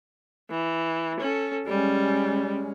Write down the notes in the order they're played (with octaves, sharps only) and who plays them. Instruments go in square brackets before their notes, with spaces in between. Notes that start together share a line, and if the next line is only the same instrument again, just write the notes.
[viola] E3
C#4 A4
[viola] G3 [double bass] G#3 C#4